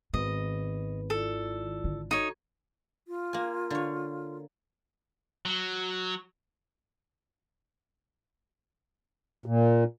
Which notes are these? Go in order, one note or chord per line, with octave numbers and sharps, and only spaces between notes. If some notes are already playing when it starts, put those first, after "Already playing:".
G#1 D#3 B3 B4 D#5
E4 F4 A4 D5
D3
D#4 F#4 A4 C#5
F4
A#3 G#5
D3 C#5
F#3
A#2